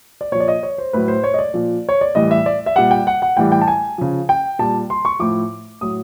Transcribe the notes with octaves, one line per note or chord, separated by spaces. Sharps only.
D5
A#2 F3 C#5
D5
D#5
C#5
C5
A2 F#3 B4
C5
C#5
D#5
D5
A#2 F3
C#5
D5
A2 E3 G3 D#5
E5
D5
E5
A#2 G3 F#5
G5
F#5
F#5
A2 E3 G3 G5
G5
A5
G#5
C#3 F3
G5
A#2 G3 A5
C6
C#6
A2 F3 D6
A2 F#3 D#6